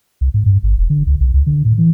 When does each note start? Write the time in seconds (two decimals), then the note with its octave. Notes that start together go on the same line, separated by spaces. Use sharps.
0.21 C2
0.34 G#2
0.46 G2
0.63 G#1
0.78 E1
0.90 D3
1.07 C#2
1.20 B1
1.34 C#2
1.46 D3
1.65 A2
1.78 E3